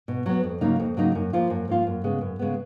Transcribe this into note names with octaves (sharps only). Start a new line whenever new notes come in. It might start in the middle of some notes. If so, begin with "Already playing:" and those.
B2
F#3 B3
F2
C#3 F#3 A#3 D#4
F2
C#3 F#3 A#3 D#4
F#2
F3 A#3 F4
F#2
F3 A#3 F4
F#2
C#3 G#3 B3
F#2
C#3 G#3 B3